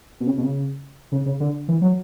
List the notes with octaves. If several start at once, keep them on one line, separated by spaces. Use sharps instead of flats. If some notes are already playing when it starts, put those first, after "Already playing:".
B2
C#3
B2
C#3
C#3
C#3
D3
E3
F#3